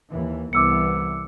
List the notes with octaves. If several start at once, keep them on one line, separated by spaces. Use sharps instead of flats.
D#2 E3
C2 E3 B3 D6 E6 C#7